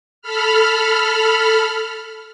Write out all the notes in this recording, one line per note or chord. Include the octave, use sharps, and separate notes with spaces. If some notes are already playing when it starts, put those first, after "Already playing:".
A4 B5 F6